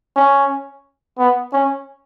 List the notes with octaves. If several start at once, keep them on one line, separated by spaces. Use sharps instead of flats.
C#4
B3
C#4